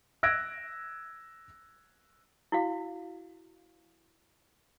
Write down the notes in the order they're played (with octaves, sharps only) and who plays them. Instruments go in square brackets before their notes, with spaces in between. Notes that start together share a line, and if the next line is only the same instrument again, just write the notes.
[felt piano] E6 F#6 G#6 A#6 D7
[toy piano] E4 F#4 F5